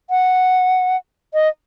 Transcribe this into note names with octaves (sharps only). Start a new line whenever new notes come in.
F#5
D#5